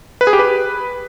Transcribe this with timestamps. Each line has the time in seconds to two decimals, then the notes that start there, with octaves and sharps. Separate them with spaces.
0.21 B4
0.27 G#4
0.33 G4
0.39 B4